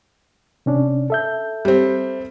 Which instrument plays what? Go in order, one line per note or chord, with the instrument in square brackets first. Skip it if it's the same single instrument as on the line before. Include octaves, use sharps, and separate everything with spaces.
[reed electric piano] C3 C#4 D4
A4 E5 G6
[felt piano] G3 C4